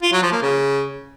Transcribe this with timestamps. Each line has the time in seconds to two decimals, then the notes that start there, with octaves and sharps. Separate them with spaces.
0.03 F4
0.13 F#3
0.22 F3
0.32 A#3
0.42 C#3